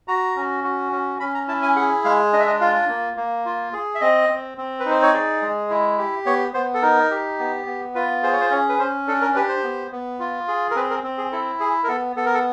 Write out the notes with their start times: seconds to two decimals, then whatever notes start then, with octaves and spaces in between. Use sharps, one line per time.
0.08 F#4 A#5
0.36 C#4
0.64 F#4
0.92 C#4
1.20 C#4 B5
1.34 A#5
1.48 E4 A5
1.62 G#5
1.76 G#4 F#5
2.04 G#3 F5
2.32 D4 D#5
2.40 E5
2.47 D#5
2.61 F4 F5
2.89 A#3
3.17 A#3
3.45 F4
3.73 G#4
3.95 E5
4.01 C4 D#5
4.29 C4
4.58 C4
4.80 B4
4.85 D#4
4.91 C5
5.02 C#5
5.14 G#4 D5
5.42 G#3
5.70 E4
5.98 G4
6.26 B3 C#5
6.54 B3 C5
6.74 A4
6.82 D#4 A#4
7.11 G4
7.39 B3
7.66 B3
7.95 F4 B4
8.23 G#4 C5
8.32 C#5
8.41 C5
8.50 C#4 C#5
8.69 B4
8.79 C#4 C5
9.08 D4 A4
9.21 A#4
9.35 G4 B4
9.49 C5
9.63 B3
9.92 B3
10.19 F4
10.48 G#4
10.71 A#4
10.76 C4 B4
10.90 A#4
11.03 C4
11.18 G#4
11.32 E4 A4
11.60 G#4
11.84 A#4
11.88 B3 A4
12.16 B3 A4
12.26 A#4
12.34 A4